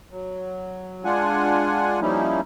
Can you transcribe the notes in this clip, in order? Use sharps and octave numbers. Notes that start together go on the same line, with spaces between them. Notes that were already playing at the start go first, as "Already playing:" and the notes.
F#3
G#3 D4 F4 F#5 G#5
F3 G3 A#3 C#4 D#4 E4